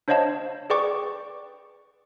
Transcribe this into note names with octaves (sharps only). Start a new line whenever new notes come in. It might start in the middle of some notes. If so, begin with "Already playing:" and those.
D4 C5 C#5 D#5 F5 A5
G#4 B4 D5 G5 C#6 D6